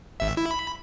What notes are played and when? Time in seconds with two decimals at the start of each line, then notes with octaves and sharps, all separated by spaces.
0.20 G#1 E5
0.37 E4
0.51 B5